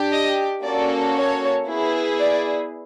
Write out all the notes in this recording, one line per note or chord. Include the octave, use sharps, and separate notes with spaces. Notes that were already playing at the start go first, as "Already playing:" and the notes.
Already playing: D4 G4
D#5
A#3 C#4 F#4 A4 D5
C#5
B3 E4 G#4
D5